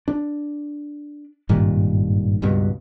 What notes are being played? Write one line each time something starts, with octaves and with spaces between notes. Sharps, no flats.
D4
G#1 G2 A#2 D#3
C#2 G2 B2